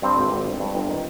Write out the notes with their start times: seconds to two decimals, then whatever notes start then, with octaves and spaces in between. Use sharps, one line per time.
0.02 G2 C4
0.17 G#1
0.32 G#1
0.46 G1
0.60 G2
0.75 G1
0.89 D#3